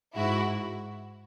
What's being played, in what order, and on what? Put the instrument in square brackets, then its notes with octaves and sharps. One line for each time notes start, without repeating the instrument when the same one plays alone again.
[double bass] G#2 [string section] E4 F#4